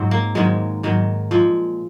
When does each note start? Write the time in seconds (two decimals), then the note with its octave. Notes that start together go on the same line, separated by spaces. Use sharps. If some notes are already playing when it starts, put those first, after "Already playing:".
Already playing: G#2 F#3 C4
0.11 A#3
0.35 G#2 D#3 F#3 G#3
0.83 G#2 D#3 F#3
1.31 A#2 F3 G#3